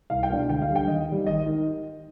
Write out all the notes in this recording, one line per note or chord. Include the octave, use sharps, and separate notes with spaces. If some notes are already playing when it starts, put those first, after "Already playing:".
C2 F5
G5
B2 G#3 D4 F5
D2 G5
F5
D3 G3
G5
D#2 D#5
D#3 G3
G#1 D#5
D#3